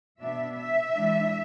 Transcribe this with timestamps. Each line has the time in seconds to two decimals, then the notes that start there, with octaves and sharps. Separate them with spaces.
0.21 B2 B3 D4 E5
0.58 E5
0.95 E3 G#3 D4